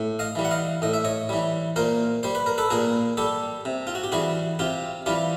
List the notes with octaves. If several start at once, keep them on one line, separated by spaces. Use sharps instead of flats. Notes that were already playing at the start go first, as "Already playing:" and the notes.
Already playing: A2
D#5 F5
E3 G3
F#5
D#5 F5
A2 D#5
E5
C#5 D#5
E3 G3
A#2 A#4 C5
G3 C5
B4
A#4
A4 B4
A#2 G#4 A#4
G3 G4 A4
C3
F4
F#4
G4
E3 G3 F#4 G#4
C3 F4 G4
E3 G3 F4 G4